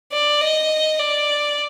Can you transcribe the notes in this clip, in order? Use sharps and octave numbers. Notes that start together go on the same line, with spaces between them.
D5
D#5
D5